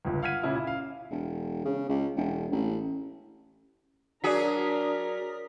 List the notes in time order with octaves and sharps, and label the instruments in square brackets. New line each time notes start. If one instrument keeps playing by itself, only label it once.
[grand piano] G1 C#2
F5 F#5 F6 G#6 B6 D#7
A#2 C#3 C#4 E4
E4
F5
[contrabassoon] E1
C#3
C#2
E1
A1
[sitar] F#3 F#4 G#4 [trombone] D4 [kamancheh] A#4 [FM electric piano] D5 D#6 B6